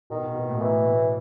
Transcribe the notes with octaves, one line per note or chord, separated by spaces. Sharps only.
B2 D#3
B2
B2
A2
B2
A2 E3
A2